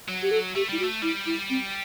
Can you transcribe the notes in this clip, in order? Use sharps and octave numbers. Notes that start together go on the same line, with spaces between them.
F#3
G4
A4
A3 G4
G3 E4
F#4
A3
G3 E4
E4
C4